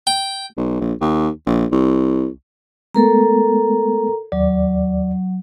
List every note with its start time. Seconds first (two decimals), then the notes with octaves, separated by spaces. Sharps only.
0.07 G5
0.57 B1
0.80 A#1
1.01 D#2
1.46 A#1
1.71 C2
2.95 G#3 A3 B3 A4 A#4 A#5
4.32 D#2 F#3 D5